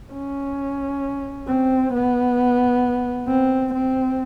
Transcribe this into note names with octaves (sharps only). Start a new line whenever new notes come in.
C#4
C4
B3
C4
C4